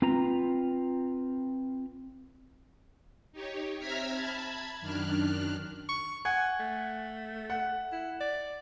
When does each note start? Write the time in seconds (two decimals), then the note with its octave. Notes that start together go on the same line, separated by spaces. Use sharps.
0.02 C4 F4 B4 A#5
3.32 D#4 G4 C#5
3.79 C4 E5 A#5 F6 G#6 B6
4.13 A5 B5 G#6
4.80 F#2 D#3 D4 F6 F#6
5.89 C#6
6.25 F#5 G#5
6.60 A3
7.50 F#5
7.92 E4
8.20 D5